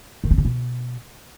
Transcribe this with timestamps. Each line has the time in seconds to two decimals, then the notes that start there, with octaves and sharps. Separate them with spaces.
0.24 D#3
0.31 C4
0.38 C#3
0.45 B2